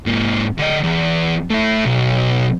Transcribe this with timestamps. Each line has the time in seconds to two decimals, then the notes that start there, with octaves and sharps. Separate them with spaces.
0.06 G#2 A#3
0.58 D3 D#5
0.83 E2
1.50 A3 E4
1.85 B1